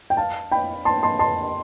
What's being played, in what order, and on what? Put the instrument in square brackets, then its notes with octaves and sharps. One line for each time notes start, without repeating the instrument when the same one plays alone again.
[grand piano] G5
F5 A5
G5 B5
A5 C6
A5 C6
A5 C6